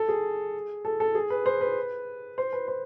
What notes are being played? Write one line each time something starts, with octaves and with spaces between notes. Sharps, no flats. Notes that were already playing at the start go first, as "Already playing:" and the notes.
Already playing: A4
G#4
A4
A4
G#4
B4
C5
B4
C5
B4
C5